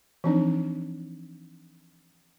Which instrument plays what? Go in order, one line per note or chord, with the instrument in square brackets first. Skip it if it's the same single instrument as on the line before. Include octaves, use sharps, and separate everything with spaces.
[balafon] E3 F3 C4 D4 D#4